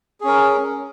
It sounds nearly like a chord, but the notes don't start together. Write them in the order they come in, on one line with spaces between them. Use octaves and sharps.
G#4 C#4 A#4